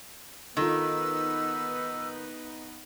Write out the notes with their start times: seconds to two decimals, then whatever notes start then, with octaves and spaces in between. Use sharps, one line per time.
0.57 D#3 B3 D#4 F4 A4 B4 E6